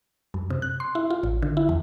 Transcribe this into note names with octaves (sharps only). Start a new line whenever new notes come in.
F#2
C3
F#6
C6
E4
F4
A1
D3
E4
E2